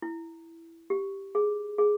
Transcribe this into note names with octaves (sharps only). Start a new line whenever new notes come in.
E4
G4
G#4
G#4